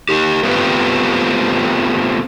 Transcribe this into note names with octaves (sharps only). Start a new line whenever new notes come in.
D#4 G4
A3 B3 C4 F4 G4 B4